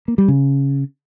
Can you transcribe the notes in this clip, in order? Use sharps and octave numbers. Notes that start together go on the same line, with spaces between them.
A#3
G3
C#3